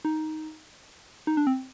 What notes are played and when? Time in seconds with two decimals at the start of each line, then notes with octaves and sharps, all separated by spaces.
0.05 D#4
1.27 D#4
1.37 D4
1.47 C4